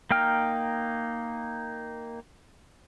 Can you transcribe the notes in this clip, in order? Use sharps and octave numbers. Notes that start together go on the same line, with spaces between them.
A#3 D#4 G5 F6